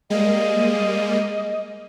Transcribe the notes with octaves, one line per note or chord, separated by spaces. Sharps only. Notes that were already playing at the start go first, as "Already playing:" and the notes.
G3 G#3 A#3 D#5